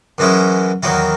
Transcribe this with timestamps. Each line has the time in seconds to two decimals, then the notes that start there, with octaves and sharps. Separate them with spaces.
0.18 F#2 E3 G#3 C#4 E4
0.83 E2 D#3 F#3 A#3 E4